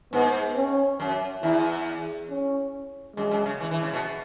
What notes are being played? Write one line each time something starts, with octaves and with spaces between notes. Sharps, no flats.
G#2 B3
C#4
F#2
E2 E4
C#4
F#2 G#3
F#2
C#3
E3
E3
C#3
B2